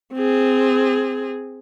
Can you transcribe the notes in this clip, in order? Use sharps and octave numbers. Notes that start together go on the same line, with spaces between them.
C4 G#4